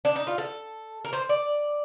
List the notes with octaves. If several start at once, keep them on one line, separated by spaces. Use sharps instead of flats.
D4
D#4
F4
A4
A#4
C5
D5